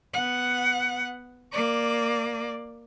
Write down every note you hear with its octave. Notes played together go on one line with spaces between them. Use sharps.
B3 F#5
A#3 D5